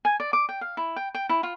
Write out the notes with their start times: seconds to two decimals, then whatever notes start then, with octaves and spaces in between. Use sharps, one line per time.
0.05 G#5
0.20 D5
0.33 D6
0.49 G5
0.61 F5
0.77 E4
0.96 G5
1.15 G5
1.29 E4
1.43 F4